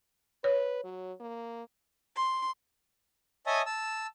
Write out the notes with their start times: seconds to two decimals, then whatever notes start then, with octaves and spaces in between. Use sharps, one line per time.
0.44 B4 C#5
0.84 F#3
1.20 A#3
2.15 C6
3.46 C#5 D#5 E5 G#5 A5 D#6
3.66 A5 E6